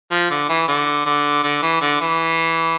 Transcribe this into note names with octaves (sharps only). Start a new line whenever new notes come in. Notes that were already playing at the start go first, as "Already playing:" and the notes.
F3
D3
E3
D3
D3
D3
E3
D3
E3